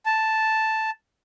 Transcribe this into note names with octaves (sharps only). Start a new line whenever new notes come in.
A5